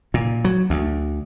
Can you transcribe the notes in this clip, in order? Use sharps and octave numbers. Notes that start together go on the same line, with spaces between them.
A#2
F#3
D2